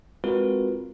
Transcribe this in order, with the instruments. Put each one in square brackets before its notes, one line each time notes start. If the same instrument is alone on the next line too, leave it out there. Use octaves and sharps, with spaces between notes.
[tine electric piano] G#3 C4 F4 F#4 A#4 B4